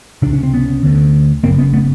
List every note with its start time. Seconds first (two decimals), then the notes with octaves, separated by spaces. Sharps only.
0.22 C#2 C3 D4
0.33 C#4
0.43 C4
0.54 B3 C#4
0.83 D2 D3
1.44 F#1 F#2 C#3 A#3 C4
1.58 B3 C#4
1.73 A3 B3